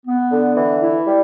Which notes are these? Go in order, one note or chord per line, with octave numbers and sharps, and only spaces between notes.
B3
D3
E3
E4
G3